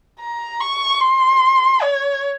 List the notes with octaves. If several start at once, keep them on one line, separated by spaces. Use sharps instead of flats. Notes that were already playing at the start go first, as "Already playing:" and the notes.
A#5
C#6
C6
C#5